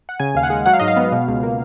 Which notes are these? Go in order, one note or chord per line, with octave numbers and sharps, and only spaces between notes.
F#5
C#3 G#5
D#2 F5
F#5
G#3
F#3 F#5
F5
G#2 D#5
F5
B3
B2
C#2
A#3